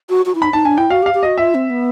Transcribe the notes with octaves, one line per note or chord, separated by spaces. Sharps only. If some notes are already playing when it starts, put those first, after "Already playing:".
F#4
F#4
E4
D#4 B5
D#4 A5
D4 G#5
E4 G5
F#4 F5
G4
F5
G4
F#4 D#5
F4 E5
C4
B3